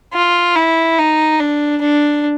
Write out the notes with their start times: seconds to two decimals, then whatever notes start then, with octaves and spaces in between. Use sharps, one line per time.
0.14 F4
0.55 E4
0.98 D#4
1.40 D4
1.81 D4